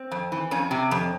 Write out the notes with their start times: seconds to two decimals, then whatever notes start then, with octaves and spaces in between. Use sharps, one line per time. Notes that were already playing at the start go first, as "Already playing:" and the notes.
Already playing: C4
0.11 F2
0.32 E3
0.51 F2 C#4
0.71 C3
0.91 F2